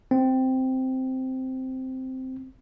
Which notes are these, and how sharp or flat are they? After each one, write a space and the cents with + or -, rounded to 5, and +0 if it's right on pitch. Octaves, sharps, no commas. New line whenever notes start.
C4 -5